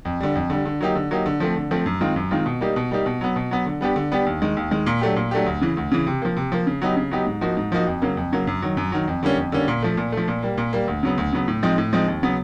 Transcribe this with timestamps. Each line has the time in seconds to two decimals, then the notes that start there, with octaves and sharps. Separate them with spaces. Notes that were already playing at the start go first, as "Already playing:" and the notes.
0.05 F2
0.21 D3 G3
0.35 F2
0.50 D3 G3
0.66 D3
0.81 F#3 A#3 D#4 G4
0.95 D3
1.11 F#3 A#3 D#4 G4
1.26 D3
1.40 F3 A3 C4
1.56 D3
1.71 F3 A3 C4
1.86 F#2
2.01 D#3 G#3 C4 F4
2.16 F#2
2.31 D#3 G#3 C4 F4
2.46 B2
2.61 G3 A#3 D#4 G4
2.76 B2
2.91 G3 A#3 D#4 G4
3.06 B2
3.21 F#3 B3
3.36 B2
3.51 F#3 B3
3.66 D3
3.81 G3 B3 D4 G4
3.96 D3
4.11 G3 B3 D4 G4
4.26 D#2
4.42 D#3 G#3
4.57 D#2
4.71 D#3 G#3
4.86 A#2
5.01 F#3 A3 D4 G4
5.16 A#2
5.31 F#3 A3 D4 G4
5.46 D2
5.61 C#3 E3
5.77 D2
5.91 C#3 E3
6.07 C3
6.22 F3 A#3
6.37 C3
6.52 F3 A#3
6.67 C#3
6.82 F#3 B3 D#4 G4
6.97 C#3
7.11 F#3 B3 D#4 G4
7.27 G#2
7.41 F3 A#3 D#4 F#4
7.57 G#2
7.72 F3 A#3 D#4 F#4
7.87 F2
8.02 C#3 F#3 A#3
8.17 F2
8.32 C#3 F#3 A#3
8.47 F#2
8.62 D#3 F#3
8.77 F#2
8.92 D#3 F#3
9.08 F2
9.23 D3 G3 A#3 C#4
9.37 F2
9.52 D3 G3 A#3 C#4
9.68 A#2
9.82 F3 A3
9.97 A#2
10.12 F3 A3
10.28 A#2
10.43 G3 A#3
10.58 A#2
10.73 G3 A#3
10.88 D2
11.03 C#3 F#3 B3
11.18 D2
11.33 C#3 F#3 B3
11.48 A2
11.63 F3 G#3 C4 D#4
11.78 A2
11.93 F3 G#3 C4 D#4
12.08 D#2
12.23 C#3 F#3 B3